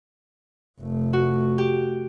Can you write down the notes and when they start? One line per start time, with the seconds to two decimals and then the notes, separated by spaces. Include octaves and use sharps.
0.80 F1 A3
1.13 F#4
1.58 G4